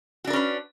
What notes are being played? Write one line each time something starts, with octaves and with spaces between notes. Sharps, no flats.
C#4 D4 F#4 A#4 B4